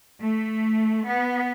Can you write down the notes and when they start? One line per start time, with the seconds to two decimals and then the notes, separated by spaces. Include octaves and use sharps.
0.21 A3
1.07 B3